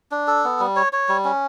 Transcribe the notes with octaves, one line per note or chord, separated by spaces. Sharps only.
D4
A4
B3
G3
C#5
C#5
G3
C#4